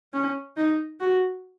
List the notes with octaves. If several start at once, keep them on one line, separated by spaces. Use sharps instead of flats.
C#4
D#4
F#4